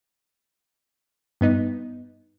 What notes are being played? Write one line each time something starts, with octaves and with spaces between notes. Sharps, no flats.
G2 B3 D#4